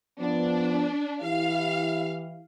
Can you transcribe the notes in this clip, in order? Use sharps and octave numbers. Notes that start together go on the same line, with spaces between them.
F3 B3 D4
E3 E4 G4 F5